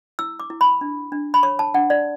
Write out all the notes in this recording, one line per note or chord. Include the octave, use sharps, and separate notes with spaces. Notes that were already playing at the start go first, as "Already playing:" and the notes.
E4 E6
D6
E4
B5
D4
D4
B5
C#5 C#6
A5
D4 F#5
D5